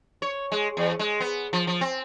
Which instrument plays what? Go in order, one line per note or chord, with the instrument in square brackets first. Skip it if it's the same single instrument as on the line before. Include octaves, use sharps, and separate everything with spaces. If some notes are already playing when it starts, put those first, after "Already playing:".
[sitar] C#5
G#3
E2
G#3
B3
F3
F3
C4